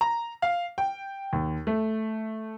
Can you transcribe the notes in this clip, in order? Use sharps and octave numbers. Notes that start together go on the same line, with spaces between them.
A#5
F5
G5
D#2
A3